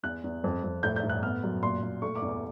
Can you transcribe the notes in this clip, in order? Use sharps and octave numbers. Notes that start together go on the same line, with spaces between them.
E2 F#6
E2
F2
F2
A2 G6
G6
A2
F#6
B3 F6
F#2
A#2 C6
A#2
A3 C#6
D6
E2
D6